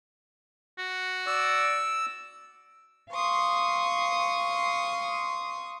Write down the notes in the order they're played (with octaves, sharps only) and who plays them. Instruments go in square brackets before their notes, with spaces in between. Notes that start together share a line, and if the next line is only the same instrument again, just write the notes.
[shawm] F#4
[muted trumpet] D5 [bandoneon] E6
[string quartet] F5 C6 C#6 D#6